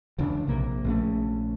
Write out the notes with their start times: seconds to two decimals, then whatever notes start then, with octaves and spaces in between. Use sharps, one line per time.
0.19 E1 C#2 C#3 D4
0.47 A#1 C3 A#3
0.85 A#1 C#3 A3